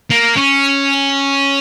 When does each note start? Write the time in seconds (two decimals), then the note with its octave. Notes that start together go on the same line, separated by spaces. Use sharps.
0.10 A#3
0.36 C#4